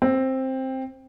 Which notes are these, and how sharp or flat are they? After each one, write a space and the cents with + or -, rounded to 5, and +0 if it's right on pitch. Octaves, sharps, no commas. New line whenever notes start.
C4 +10